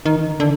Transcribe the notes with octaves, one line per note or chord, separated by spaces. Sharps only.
D#3
D3